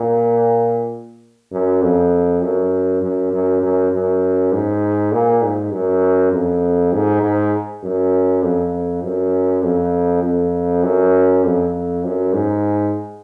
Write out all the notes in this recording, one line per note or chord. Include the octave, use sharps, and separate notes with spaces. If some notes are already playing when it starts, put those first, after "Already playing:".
Already playing: A#2
F#2
F2
F#2
F#2
F#2
F#2
F#2
G#2
A#2
G#2
F#2
F2
G#2
G#2
F#2
F2
F#2
F2
F2
F#2
F2
F#2
G#2